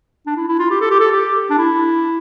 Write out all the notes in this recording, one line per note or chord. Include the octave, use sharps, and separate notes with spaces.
D4
E4
E4
F4
G4
A4
G4
A4
G4
D4
E4